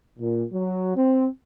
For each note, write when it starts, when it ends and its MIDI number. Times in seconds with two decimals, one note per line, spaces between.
0.19 0.44 46
0.53 0.96 54
0.97 1.27 60